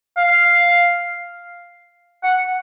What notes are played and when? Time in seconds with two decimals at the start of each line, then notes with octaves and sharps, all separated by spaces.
0.17 F5
2.23 F#5